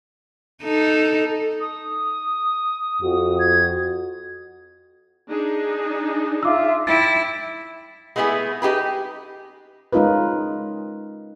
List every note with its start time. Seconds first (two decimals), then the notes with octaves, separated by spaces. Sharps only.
0.63 D#4 A4
1.61 D#6
3.03 F2 F#4
3.39 G#6
5.29 D4 D#4 G#4
6.43 F4 E5 D6 E6
6.87 E4 G5 A6 D7
8.16 G#3 A3 B3 E4 G#4
8.62 D#4 G4 G#4 B4
9.92 G#3 C#4 D#4 F4 A#4 B4